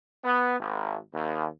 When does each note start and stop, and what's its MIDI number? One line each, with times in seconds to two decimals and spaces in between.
0.25 0.57 59
0.60 0.97 32
1.15 1.47 39